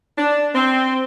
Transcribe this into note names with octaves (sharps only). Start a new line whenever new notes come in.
D4
C4